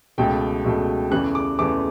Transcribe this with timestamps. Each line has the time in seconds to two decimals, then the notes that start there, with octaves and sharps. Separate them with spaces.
0.18 C#2 B2 A3 G5
0.64 C#2 B2 A3
1.11 E2 C#3 E3 A3 F#6
1.35 D6
1.59 E2 C#3 E3 A3 D6